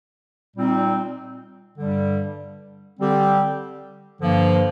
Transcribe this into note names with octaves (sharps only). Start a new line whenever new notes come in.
A#2 G3 C4 D#4
G2 D3 G3
D3 G3 C4 G4
G2 D3 F3 A#3